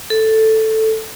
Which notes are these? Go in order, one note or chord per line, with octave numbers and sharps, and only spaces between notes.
A4